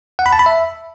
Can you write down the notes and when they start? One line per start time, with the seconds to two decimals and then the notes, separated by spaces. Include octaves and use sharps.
0.19 F#5
0.26 B5
0.33 A5
0.39 B5
0.46 E5